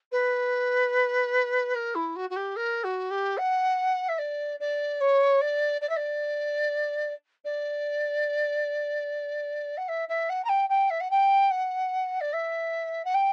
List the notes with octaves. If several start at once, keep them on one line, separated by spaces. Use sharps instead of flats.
B4
A#4
E4
F#4
F#4
G4
A#4
F#4
G4
F#5
E5
D5
D5
C#5
D5
D5
E5
D5
D5
F#5
E5
E5
F#5
A#5
G5
G5
E5
F#5
G5
F#5
D5
E5
F#5
G5